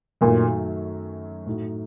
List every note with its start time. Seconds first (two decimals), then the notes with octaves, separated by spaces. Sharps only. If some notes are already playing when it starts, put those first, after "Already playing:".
0.21 F#2 A#2 D#3 F#3 A3
1.46 A2 A3 D#4 F#4